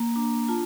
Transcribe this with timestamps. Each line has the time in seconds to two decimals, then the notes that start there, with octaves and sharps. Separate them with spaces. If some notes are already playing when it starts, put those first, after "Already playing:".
Already playing: A#3
0.15 D4 A#5
0.49 F4 A5